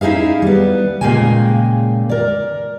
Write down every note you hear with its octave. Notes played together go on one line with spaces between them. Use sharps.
C#4 D#4 E4 G#4 F5
G3 B3
A#2 C#3 G#3 A#3 G5 G#5
A#4 D5